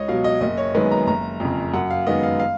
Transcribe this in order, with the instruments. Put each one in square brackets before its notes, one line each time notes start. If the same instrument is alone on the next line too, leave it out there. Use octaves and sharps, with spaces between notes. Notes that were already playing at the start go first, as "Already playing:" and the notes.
Already playing: [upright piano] C#2 C#5 D#5
B2 F#3 F5
D#5
F#1 D#5
C#5
F#2 D#3 G#3 B3 B4
A#5
F#1 A#5
F2 C#3
F#2 F#5
F5
D#3 G#3 B3 D#5
F5
F5